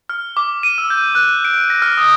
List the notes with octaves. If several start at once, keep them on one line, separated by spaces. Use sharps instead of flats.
F6
D6
D#7
E6
G6
F#6
D7
A#6
F6
D#6